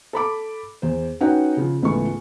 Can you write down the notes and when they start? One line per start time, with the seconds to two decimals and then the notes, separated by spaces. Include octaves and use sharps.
0.13 A4 B5 D6
0.82 E2 C5
1.20 C#4 D#4 F#4 B4 F#5 G5
1.57 C#3 F3
1.82 C#2 G#2 E3 A3 B3 C#6